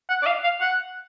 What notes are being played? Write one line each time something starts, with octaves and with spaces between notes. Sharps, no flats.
F#5
D5
F5
F5
F#5